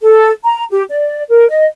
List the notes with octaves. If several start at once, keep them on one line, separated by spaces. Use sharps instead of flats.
A4
A#5
G4
D5
A#4
D#5